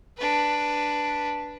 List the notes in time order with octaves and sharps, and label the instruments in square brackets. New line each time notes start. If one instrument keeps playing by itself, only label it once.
[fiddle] D4 B4